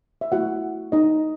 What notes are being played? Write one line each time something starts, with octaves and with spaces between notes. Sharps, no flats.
E5
A3 E4 F#4 F#5
D#4 D#5